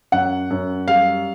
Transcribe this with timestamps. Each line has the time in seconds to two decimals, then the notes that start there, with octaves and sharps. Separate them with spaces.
0.12 F#2 F#5
0.50 F#2
0.88 G3 F5